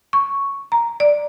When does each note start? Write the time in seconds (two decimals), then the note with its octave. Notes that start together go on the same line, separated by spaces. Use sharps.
0.13 C#6
0.72 A#5
1.00 D5